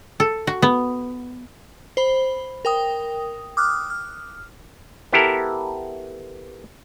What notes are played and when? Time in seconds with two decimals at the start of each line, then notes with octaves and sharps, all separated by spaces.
0.20 A4
0.47 F#4
0.62 B3
1.97 C5 B5
2.65 A#4 G5 D#6
3.57 D6 D#6 F6 F#6
3.90 F6
5.13 B3 E4 G4 A4 A#4